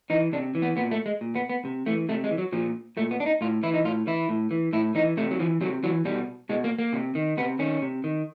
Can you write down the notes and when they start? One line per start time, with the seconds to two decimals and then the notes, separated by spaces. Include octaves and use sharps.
0.10 E3 D#4
0.33 C3 D4
0.55 E3
0.62 B3
0.77 A#2 B3
0.91 A3
1.06 G#3
1.21 A#2
1.35 B3
1.50 B3
1.65 C3
1.86 E3 A3
2.09 C3 A3
2.24 G#3
2.31 E3
2.38 F#3
2.52 A#2 F3
2.97 A#2 A3
3.11 B3
3.20 D4
3.26 D#4
3.41 A2 F4
3.63 E3 E4
3.74 D#4
3.84 A2 F4
4.07 E3 E4
4.29 A2
4.51 E3
4.73 A2 E4
4.95 E3 D#4
5.17 C3 A3
5.31 F#3
5.40 E3 F3
5.61 C3 F#3
5.83 E3 F#3
6.05 B2 G3
6.49 B2 G#3
6.64 A#3
6.79 A#3
6.93 C3
7.15 D#3
7.37 C3 B3
7.59 D#3 C#4
7.82 C3
8.04 D#3